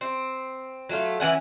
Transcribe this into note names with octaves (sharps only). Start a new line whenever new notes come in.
C4
F#3 A3 F4
E3 F3 C#4 F#5